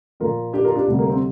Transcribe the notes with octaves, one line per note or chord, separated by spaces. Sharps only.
A#2 F3 A#3 F4 A#4
D4 G4
F4 A#4
D4 G4
D2 C3 G3
A#3
C4